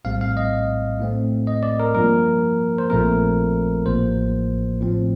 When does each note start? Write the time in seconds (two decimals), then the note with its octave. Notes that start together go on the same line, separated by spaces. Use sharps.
0.05 A#1 A2 G3 C4 F5
0.21 F5
0.37 D#5
1.00 A2 A3 C4
1.47 D#5
1.63 D5
1.80 A#4
1.95 G2 F3 A#3 A#4
2.78 C5
2.90 A#1 A#2 F3 A3 C4 A#4
3.85 A1 A2 F3 A#3 C5
4.81 A2 F3 C4